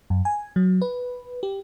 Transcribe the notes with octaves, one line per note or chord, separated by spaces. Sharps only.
F#2
G#5
F#3
B4
G4